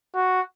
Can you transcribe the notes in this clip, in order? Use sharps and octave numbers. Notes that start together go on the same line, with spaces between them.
F#4